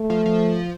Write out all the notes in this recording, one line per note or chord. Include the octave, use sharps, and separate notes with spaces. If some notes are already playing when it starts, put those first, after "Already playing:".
Already playing: A3
F3
F3